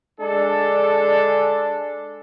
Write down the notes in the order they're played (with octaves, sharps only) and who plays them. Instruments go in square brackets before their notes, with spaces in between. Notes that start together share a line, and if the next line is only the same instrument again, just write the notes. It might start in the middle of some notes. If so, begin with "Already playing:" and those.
[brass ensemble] G#3 D4 A4